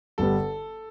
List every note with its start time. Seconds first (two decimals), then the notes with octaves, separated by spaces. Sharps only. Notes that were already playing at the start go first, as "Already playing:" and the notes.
0.18 G1 G2 G3 B3 A4